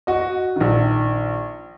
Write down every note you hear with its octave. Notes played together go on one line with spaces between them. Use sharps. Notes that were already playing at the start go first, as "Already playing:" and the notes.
F#4 D#5
A#1 D#3